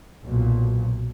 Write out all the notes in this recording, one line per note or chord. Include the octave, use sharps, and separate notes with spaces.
B1 A#2